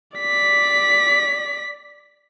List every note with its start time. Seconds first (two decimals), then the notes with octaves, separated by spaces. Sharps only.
0.17 D5 B6